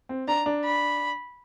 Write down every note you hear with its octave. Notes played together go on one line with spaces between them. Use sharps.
C4
D4 A#5
D4
B5